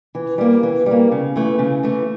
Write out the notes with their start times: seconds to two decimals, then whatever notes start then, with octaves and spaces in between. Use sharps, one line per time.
0.15 E3
0.38 G3 A#3
0.63 E3
0.86 G3
0.91 A#3
1.12 C#3
1.36 E3 A3
1.59 C#3
1.83 E3 A3